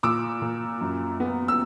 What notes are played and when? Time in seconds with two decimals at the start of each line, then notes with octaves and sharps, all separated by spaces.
0.03 A#2 D6 E6
0.42 A#2
0.81 F#2
1.20 B3
1.48 E6